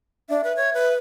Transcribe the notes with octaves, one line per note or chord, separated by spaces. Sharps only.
D4 E5
B4
C#5
B4